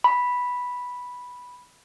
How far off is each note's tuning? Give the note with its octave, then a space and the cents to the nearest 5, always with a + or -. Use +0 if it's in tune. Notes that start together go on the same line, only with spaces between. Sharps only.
B5 -5